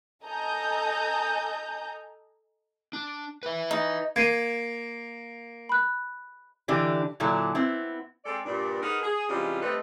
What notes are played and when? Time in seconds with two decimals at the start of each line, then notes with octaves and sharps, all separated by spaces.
0.24 A4 D#5 G#5 A#5 G6
2.93 D4
3.43 B4 E5
3.71 D#4
4.16 A#3 G#6 C7 D#7
5.69 B5 F#6
6.68 D3 E3 D4 E4 G4
7.20 A#2 D3 F#3 E4 A4
7.55 B3 C4 E4
8.25 G#3 C4 A4 D5
8.46 G2 A#2 D4
8.82 B3 D#4 G#4 A#4
9.03 G#4
9.29 C3 E3 G3 G#3 C#4 F4
9.61 G3 A3 C4 A4 B4 D#5